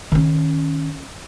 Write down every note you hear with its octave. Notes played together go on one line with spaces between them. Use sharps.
D#3 C#4